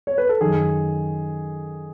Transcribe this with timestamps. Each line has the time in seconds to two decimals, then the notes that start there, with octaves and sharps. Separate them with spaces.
0.07 C#5
0.18 B4
0.29 A4
0.41 F#2 D#3 G#4